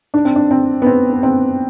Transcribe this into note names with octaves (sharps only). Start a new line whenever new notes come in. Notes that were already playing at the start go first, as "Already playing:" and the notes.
D4
C4
D4
C4
B3
C4
B3
C4